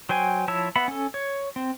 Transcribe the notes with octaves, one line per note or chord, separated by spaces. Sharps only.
F#3 C5 G5 G#5
F3 E4 C#5 A5 E6
B3 E5 F#5 B5
C#4 A4
C#5
C4